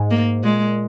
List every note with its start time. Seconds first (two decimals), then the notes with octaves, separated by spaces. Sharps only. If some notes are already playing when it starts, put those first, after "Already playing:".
Already playing: G#2
0.10 A#3
0.43 A#2 G#3